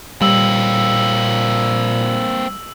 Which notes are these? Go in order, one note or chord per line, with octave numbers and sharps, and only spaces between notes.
A#2 G3 A#3 C4 E6 F#7